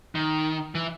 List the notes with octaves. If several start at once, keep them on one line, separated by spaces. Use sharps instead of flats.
D#3
E3